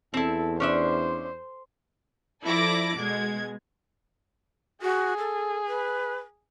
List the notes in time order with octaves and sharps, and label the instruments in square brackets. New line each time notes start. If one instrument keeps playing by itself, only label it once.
[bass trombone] E2 [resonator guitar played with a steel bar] C4 E4 [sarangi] A4
[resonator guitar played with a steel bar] C#4 D4 E5 [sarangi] C5
[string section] F3 E4 A4 D5 D6 A#6
B2 G#3 G#6
[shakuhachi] F#4 [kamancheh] G#4
[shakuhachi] A4
B4